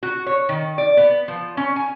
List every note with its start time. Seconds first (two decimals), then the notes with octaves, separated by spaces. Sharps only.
0.03 F#4
0.26 C#5
0.49 D#3
0.78 D5
0.97 B3
1.28 F3
1.57 C#4
1.76 G#5